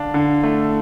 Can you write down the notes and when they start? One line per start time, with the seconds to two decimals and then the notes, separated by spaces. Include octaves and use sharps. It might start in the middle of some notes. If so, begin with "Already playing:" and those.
Already playing: D3 D4 F5
0.14 D3
0.44 A3